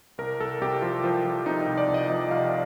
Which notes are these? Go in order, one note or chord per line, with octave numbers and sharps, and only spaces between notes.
C2 A#4
C2 A4
C2 G4
F3 F4
F3
F3
C3 D#4
D#4
C2
D5
C2
D#5
F3 D#5
C2 F5